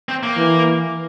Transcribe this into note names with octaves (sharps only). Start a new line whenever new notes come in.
C4
A#3
E3